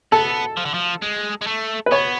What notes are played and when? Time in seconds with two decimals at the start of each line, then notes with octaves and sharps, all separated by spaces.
0.12 B3 A4
0.57 F3
0.65 D3
0.74 F3
1.02 G#3
1.41 G#3
1.47 A3
1.86 B4
1.92 B3 C#5